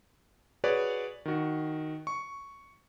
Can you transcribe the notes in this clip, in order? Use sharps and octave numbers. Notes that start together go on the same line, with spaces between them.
F#4 G#4 B4 C#5 D5
D#3 F#4
C#6